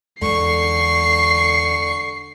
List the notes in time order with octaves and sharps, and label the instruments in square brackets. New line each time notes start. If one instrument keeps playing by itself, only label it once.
[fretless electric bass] E2 G#3 [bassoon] D3 [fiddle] C#6 [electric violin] C7